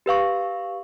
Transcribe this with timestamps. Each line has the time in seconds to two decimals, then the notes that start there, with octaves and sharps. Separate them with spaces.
0.06 G4 B4 F5 C#6